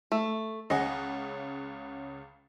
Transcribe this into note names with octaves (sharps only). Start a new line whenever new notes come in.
A3
C#2 C#3 D#5 F#5 G#5